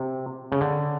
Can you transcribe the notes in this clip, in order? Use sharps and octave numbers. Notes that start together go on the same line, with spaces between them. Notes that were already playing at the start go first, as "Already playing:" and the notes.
Already playing: C3
C#3
D3